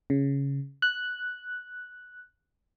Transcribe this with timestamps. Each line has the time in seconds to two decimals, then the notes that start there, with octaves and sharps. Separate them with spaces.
0.10 C#3
0.82 F#6